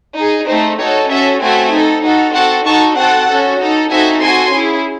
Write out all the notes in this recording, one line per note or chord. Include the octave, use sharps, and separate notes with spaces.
D#4 G#4
A3 C4 D#4 C5
D#4 F#4 A4 C#5
C#4 F#4 A4 C#5 E5
A3 C4 F#4 A4 E5 G#5
D#4 A4
D#4 F#4 A4
C4 F#4 A4 F#5 A5
D#4 F#4 A4 A5 C#6
C4 F#4 A4 F#5 A5
C#4 F#4 A4
D#4 A4
C4 D#4 F#4 A4 E5 G#5
C4 F#4 A4 G#5 C6
C#4 E4 G#4